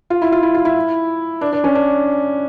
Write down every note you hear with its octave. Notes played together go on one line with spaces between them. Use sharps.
F4
E4
F4
E4
F4
E4
D4
D4
C#4
D4